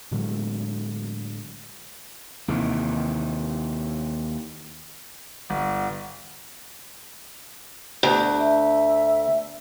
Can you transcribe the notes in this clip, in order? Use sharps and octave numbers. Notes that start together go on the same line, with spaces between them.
A2 D3 F#3 G#3
D#2 C3 D#3 E3
G1
D2
E5